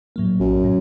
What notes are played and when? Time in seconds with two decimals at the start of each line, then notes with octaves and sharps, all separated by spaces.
0.16 A2 F#3 A#3
0.39 A#1 F#2
0.64 A2